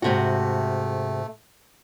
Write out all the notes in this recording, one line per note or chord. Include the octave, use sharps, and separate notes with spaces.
G#2 C3 A3 F#4